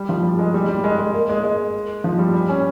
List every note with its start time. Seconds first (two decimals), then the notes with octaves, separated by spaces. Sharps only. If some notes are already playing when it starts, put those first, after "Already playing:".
Already playing: G3
0.09 F3
0.24 G3
0.39 G#3
0.54 G3
0.69 G3
0.84 G#3
0.99 G#3
1.14 A#3
1.29 G#3
1.43 G#3
2.04 F3
2.18 G3
2.34 G3
2.49 C#4